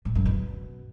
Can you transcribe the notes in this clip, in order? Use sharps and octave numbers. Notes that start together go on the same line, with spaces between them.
A2
F#2
B2